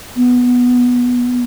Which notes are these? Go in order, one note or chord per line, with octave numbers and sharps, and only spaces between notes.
B3